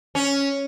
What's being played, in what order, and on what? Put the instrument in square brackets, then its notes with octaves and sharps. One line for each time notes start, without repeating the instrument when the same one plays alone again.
[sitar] C#4